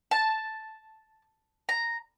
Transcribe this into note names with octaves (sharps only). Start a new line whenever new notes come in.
A5
A#5